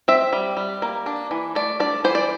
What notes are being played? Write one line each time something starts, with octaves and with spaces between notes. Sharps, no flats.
C4 E5
G3
G3
A#3
D4
E3
A3 D5
D4 D5
E3 C5
D5